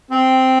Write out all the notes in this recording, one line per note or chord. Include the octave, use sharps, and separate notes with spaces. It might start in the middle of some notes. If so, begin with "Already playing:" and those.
C4